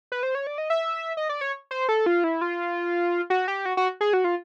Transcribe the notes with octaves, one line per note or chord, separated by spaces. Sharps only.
B4
C5
C#5
D5
D#5
E5
D#5
D5
C#5
C5
A4
F4
E4
F4
F#4
G4
F#4
F#4
G#4
F#4
F4